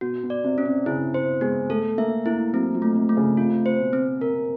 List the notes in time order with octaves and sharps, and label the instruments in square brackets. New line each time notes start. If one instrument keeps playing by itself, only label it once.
[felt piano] B2 [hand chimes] F#4
[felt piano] B2
[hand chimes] D5
[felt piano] C3
[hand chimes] C#4
[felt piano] C3
[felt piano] C#3 [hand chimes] E4
[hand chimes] C5
[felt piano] G#3 [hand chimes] B3
[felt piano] A3 [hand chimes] A4
[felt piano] A#3 [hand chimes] E5
[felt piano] A#3 [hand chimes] E4
[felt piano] F#3 [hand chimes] C4
[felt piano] F3
[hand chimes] A3
[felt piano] C3
[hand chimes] A3
[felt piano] C#3
[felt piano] C3 [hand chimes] F4
[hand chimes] C5
[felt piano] B2
[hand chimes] C4
[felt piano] C3 [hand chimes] A#4